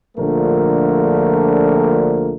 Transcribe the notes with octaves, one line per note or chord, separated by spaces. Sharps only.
A#1 A#2 D3 F3 A3 A#4